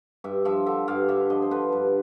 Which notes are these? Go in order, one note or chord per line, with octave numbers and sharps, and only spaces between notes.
G2 E5
F3 E5
D3 E5
G2 F5
G2 E5
F3 D#5
C5
D3 B4
G2